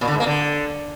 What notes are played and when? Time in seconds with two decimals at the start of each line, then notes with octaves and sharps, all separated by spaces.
0.01 A#2
0.07 D3
0.14 G#2
0.20 A#3
0.26 D3